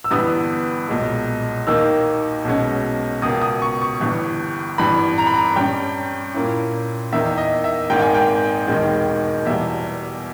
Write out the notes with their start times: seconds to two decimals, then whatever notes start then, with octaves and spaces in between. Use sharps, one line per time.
0.04 E6
0.11 G1 G2 E3 G3 B3 D#6
0.89 B1 A#2 G#3
1.67 D#2 D#3 A#3 D#4 E6
2.45 B1 B2 G#3 C#4
3.22 C#2 B2 A#3 D#6
3.42 D#6
3.62 C#6
3.82 C#6
4.01 G1 G2 E3
4.78 G#1 G2 E3 B5
5.18 A#5
5.27 B5
5.35 A#5
5.56 G2 G3 C#4 G5
6.34 A#2 A#3 C#4 E4
7.12 E2 D#3 A#3 D#4 E5
7.38 D#5
7.64 E5
7.90 G#1 G#2 D#3 A#3 G5
8.02 G#5
8.14 G5
8.67 E1 D#2 D#3 G#3
9.45 E2 B2 G3 E5